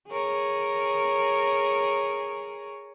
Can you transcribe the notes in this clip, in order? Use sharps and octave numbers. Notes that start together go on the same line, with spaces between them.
G#4 A#4 C#5